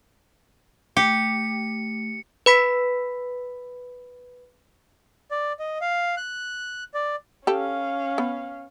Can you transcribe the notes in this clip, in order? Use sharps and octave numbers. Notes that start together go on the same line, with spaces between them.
A3 G4 C#7
B4 B5 B6
D5
D#5
F5
F#6
D5
C#4 G4 A4 F5
B3